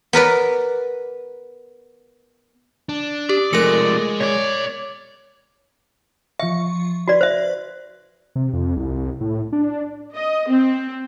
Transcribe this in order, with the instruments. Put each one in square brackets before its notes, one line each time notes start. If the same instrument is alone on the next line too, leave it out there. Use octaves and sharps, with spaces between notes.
[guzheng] B3 A#4 B4 D5
[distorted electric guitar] D4
[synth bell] G4 [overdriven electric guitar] D5
[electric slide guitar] F3 A3 [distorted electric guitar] G#3 [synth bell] A#4 A#6 C#7
[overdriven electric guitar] B2 D5 [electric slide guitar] C#5
[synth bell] F3 C#6 [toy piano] E5
[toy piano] F#4 D5 [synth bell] B4
[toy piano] C5 E5
[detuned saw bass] C3
F2
C2
A2
D4
[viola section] D#5
C4